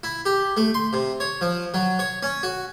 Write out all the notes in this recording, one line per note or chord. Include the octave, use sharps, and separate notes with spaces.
E4
G4
A3
C6
C3
C#5
F3
F#3
C#5
C#4
F#4